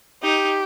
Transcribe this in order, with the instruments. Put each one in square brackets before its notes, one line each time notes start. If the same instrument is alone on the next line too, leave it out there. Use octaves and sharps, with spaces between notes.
[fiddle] D#4 [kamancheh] G4